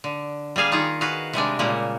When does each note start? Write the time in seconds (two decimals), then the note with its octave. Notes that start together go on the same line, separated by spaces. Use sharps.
0.04 D3
0.56 G3 A#3 G#4 F5 G#5
0.71 D#3 D#4 F4 G#4
1.01 F#4 G#4 B4 F5
1.33 C3 G3 G#3 D4
1.59 A#2 C#3 G3 G#3 A#3